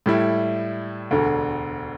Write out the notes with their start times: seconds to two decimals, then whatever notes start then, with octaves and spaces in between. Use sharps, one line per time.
0.06 A2 G3 E4
1.11 E1 D2 D3